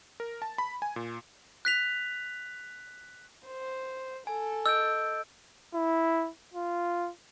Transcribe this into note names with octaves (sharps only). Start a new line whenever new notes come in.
A#4
A5
B5
G#5
A#2
F#6 B6 F7
C5
A4 G#5
D#5 E6 G6 D7
E4
F4